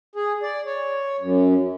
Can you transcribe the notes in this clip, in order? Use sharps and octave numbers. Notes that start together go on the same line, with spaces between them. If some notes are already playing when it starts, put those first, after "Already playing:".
G#4
D5
C#5
F#2